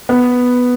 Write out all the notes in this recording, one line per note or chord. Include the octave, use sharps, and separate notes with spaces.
B3